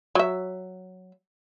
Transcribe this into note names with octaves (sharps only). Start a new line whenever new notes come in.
F#3 E5